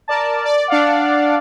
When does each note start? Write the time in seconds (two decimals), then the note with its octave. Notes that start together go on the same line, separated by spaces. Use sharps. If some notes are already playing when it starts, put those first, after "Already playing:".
0.08 A#4 D5 A5
0.45 D5
0.68 D4 D5 F5 F#5